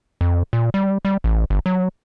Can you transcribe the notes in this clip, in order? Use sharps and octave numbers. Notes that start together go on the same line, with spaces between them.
F2
A#2
G3
G3
A1
G1
F#3